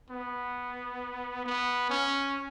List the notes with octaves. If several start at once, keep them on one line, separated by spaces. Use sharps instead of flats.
B3
B3
C#4